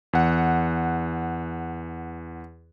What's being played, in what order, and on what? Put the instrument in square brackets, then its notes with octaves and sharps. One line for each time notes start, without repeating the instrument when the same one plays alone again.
[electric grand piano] E2 F#5